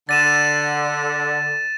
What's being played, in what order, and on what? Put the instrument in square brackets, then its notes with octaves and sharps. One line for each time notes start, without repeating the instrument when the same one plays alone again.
[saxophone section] D3 [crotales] A6 D#7 E7